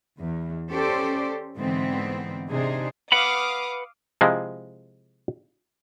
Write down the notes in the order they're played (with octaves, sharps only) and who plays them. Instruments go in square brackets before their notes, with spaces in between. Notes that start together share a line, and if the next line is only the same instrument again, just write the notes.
[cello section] E2
C#4 G4 A4 C5 D5
G#2 D3 E3 B3 C4
C3 D4 D#4 G#4 C5
[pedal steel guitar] B4 F#5 B5 [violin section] F5 D6 D#6
[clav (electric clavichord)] C3 F3 G#3 E4